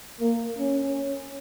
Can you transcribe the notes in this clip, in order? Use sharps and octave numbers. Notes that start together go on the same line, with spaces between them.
A#3
C#4